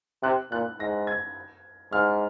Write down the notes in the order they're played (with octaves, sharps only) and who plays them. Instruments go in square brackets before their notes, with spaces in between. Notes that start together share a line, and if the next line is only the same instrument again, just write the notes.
[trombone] C3 [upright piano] F#6
[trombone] A#2 [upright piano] F#6
[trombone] G#2 [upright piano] A#6
[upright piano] G#6
[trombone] G#2 [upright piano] F6